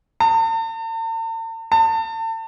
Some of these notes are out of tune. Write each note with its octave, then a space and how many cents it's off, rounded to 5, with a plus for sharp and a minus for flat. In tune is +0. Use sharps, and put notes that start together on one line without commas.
A5 +45
A5 +35